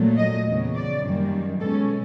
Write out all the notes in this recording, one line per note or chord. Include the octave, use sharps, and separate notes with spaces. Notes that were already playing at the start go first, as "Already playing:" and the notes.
Already playing: A#2 F#3 A3
D#5
E2 C#3 F#3
D5
F#2 D#3 G3 A#3
B2 G#3 C#4 A4